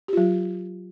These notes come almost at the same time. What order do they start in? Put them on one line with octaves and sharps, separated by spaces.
G4 F4 F#3